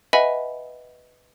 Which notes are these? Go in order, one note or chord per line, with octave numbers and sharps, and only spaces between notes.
B4 D#5 E5 F#5 G#5 B5